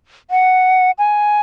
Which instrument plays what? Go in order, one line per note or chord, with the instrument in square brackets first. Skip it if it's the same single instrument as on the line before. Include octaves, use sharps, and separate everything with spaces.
[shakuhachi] F#5
G#5